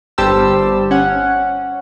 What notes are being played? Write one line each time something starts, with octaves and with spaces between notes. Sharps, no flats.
G1 G3 G4 C5 A5 E6
C#4 F#5